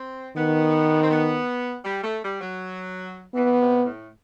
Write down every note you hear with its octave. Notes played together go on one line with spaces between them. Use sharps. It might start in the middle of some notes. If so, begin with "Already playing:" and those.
Already playing: C4
D#3 B3
C4
B3
G3
A3
G3
F#3
E3 B3
C3
A2